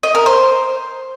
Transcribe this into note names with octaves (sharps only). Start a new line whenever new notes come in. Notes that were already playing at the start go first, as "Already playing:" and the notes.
D#5
A#4
C5